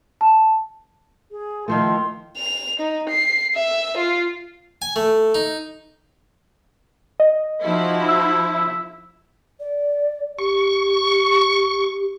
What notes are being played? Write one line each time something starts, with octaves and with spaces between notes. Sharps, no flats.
A5
G#4
D#3 F3 A3 C6
F7
D#4
C7
E5
F4
G#5
A3
D#4
D#5
F3 D#4 E4 F#4
E6
E5
D5
G4 C#6